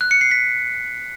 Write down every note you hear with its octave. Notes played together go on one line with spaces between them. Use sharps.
F#6
C#7
C7
B6